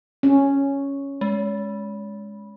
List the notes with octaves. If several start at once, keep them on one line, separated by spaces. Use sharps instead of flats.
C#4
G#3